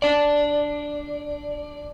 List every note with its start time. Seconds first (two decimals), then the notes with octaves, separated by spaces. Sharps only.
0.02 D4 D5